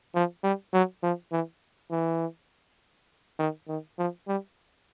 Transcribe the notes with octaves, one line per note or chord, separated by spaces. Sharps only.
F3
G3
F#3
F3
E3
E3
D#3
D#3
F3
G3